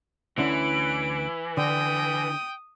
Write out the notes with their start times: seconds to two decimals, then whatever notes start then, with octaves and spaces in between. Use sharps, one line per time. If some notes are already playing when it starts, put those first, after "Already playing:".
0.38 D2 D3 E3 C#4 D7
1.57 D3 G5 D#6